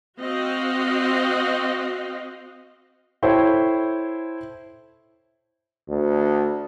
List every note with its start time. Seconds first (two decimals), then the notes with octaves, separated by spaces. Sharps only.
0.20 C4 F#4 D#5 F5
3.23 E4 A4 C5 C#5 G5
5.88 D2